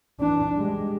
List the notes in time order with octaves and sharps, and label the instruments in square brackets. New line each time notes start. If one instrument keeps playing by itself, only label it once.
[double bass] E3 D4
G3 G#3